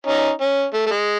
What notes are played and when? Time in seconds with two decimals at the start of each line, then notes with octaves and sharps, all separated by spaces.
0.06 C#4 D#4
0.41 C#4
0.74 A3
0.86 A3
0.91 G#3